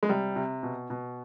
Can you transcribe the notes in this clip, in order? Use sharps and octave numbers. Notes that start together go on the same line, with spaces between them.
G#3
C3 G3
C3
B2
B2